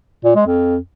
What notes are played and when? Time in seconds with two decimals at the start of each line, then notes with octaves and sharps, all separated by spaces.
0.24 A#2
0.36 G#3
0.47 F2